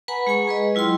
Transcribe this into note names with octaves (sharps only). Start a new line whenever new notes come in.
B4 F#5 G#5 A#5 B5
G#3 G#4 G#5 C#6
G#4 B4 D#5
F#3 E4 F4 G5 C6